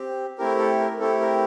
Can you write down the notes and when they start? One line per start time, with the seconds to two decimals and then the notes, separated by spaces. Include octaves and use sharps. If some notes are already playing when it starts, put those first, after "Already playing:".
Already playing: C4 G4
0.38 A3 C4 E4 G4 A#4
0.59 A4
0.79 A#4
0.99 A3 C4 E4 G4 A4
1.20 A#4